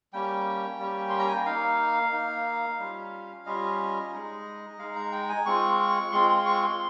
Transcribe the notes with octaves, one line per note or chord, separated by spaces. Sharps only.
G3 A#3 C#4 G5
G3 A#3 C#4
C6
A#5
G#5
G5
A#3 D#4 F5
A#3 D#4
G3 C#4 F4
G3 C#4 F4 D#5
G#3 D#4
G#3 D#4 F5
A#5
G5
G#5
G#3 C4 F4 C#6
G#3 C4 F4 C6
C6
C#6
C6